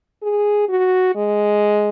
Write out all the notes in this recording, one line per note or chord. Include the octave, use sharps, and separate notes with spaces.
G#4
F#4
G#3